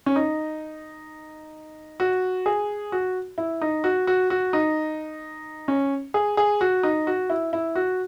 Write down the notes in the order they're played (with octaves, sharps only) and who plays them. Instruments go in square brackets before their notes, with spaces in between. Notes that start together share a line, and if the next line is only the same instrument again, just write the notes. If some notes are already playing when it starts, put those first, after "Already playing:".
[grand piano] C#4
D#4
F#4
G#4
F#4
E4
D#4
F#4
F#4
F#4
D#4
C#4
G#4
G#4
F#4
D#4
F#4
E4
E4
F#4